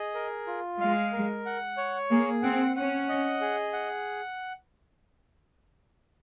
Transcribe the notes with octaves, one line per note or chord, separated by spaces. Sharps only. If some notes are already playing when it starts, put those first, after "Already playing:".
Already playing: G#4 D#5
A#4
F4
G#3 F5
A#4
F#5
C#5
A#3 G#4
C4 F#5
C#4 F#5
D#5
G#4
F#5